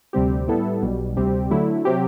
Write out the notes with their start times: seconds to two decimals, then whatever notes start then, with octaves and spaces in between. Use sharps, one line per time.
0.13 D2 C3 G3 C4 G4
0.48 A2 G3 B3 E4 A4
0.82 B1 B2 G3
1.16 D2 C3 G3 C4 G4
1.50 D3 F#3 A3 E4
1.85 C3 F#3 C4 G4